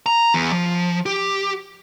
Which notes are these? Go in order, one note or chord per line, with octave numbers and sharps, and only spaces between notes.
A#5
E2
F3
G4